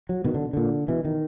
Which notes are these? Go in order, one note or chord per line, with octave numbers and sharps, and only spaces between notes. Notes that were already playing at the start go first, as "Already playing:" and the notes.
F#3
B2 D#3
D3
A#2 D3
B2 E3
D#3